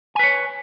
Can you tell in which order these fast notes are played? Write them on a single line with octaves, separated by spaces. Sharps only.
G#5 B4 C#5